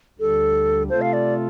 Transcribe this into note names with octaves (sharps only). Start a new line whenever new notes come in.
D2 D3 G3 A4
C3 A3 F4 A4 C5
F5
D5